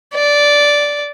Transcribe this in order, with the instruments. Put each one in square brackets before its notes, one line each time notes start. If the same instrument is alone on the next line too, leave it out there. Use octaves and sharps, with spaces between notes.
[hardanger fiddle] D5